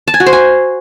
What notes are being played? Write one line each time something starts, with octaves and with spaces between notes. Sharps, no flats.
A5
G#5
F#4
C5
G#5